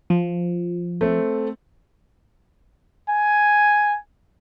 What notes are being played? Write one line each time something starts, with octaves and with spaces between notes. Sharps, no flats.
F3
A3 C4
G#5